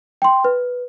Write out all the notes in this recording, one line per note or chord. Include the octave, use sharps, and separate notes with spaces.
G5 C6
B4